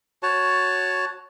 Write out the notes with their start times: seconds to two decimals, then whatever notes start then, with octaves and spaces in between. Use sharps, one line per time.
0.23 F#4 C#5 A5